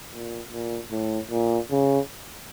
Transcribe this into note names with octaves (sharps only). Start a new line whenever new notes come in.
A#2
A#2
A2
A#2
C#3